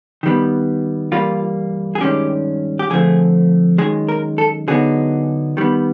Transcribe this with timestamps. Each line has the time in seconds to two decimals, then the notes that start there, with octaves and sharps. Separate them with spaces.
0.23 D#3 G3 B3
1.12 G2 E3 G3 A#3 F4
1.95 G#4
2.01 G2 D#3 G#3 C#4 G4
2.79 G4
2.90 F2 D3 F3 A3 G#4
3.78 F#2 D#3 G#3 G#4
4.09 A#4
4.38 A4
4.68 D3 F#3 B3 D#4 G#4
5.57 D#3 G3 B3